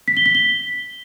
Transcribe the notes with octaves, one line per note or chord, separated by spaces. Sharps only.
B6
G7
B6
G7